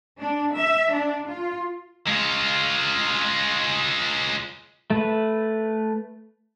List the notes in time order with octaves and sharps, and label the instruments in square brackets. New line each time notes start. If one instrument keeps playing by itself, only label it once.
[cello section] D4
E5
D4
F4
[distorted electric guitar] G#3 F4
[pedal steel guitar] A3 B4